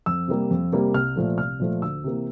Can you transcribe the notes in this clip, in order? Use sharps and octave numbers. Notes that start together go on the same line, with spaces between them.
F2 E6
C3 G3 A#3
F2
C3 G3 A#3
C2 F6
A#2 F3 A3
C2 F6
A#2 F3 A3
D2 E6
C3 E3 A#3